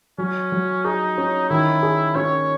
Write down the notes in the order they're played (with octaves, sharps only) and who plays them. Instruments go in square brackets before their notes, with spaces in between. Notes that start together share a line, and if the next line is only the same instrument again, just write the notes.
[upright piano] F#3 [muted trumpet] C#4
[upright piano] F#3
[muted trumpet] D#4 [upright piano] G#4
[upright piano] C#4
[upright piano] D#3 [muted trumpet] E4
[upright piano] G#4
[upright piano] C#4 [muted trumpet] C#5